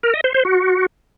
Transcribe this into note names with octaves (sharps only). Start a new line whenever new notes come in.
A#4
D#5
C5
C5
F#4